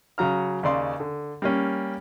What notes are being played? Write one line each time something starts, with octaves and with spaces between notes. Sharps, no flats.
C#3 F#3 A#5 F6
D#2 C#3 D5 C6
D3
G3 A#3 C#4